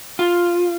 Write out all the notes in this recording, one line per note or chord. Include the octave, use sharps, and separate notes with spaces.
F4